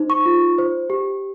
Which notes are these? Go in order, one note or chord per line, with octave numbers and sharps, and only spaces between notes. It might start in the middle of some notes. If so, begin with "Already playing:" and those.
Already playing: D#4 C5
C#6
F4
C5
G4